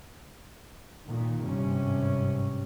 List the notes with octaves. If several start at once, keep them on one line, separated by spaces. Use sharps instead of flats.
A#2 D#3
G#1 G2 C3 C#4